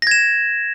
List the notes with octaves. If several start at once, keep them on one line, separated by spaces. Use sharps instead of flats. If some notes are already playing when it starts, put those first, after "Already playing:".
G#6 A#6 E7